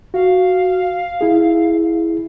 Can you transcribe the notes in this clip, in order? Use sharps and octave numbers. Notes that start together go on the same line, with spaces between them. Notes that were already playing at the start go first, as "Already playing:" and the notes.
F#4 F5
E4 G#4